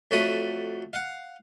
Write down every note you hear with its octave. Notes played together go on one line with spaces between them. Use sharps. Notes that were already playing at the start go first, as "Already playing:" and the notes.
F2 F#3 A3 F#4 B5 D#6
F5 F#5